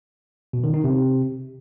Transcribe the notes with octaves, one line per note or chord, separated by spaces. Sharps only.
B2
D#3
D#4
C3